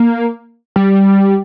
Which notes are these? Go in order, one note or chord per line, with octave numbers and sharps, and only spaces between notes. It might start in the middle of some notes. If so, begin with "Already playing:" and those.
Already playing: A#3
G3